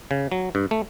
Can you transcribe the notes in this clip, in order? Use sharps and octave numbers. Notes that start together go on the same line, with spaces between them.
C#3
F#3
G2
A3